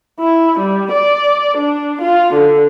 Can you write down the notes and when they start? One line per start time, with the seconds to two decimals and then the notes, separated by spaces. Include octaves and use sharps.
0.20 E4
0.59 G3
0.92 D5
1.57 D4
2.01 F4
2.34 D3